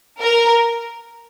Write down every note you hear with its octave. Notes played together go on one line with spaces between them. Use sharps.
A#4